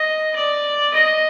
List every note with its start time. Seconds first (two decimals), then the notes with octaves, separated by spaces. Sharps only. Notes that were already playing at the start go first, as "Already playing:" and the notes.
Already playing: D#5
0.36 D5
0.94 D#5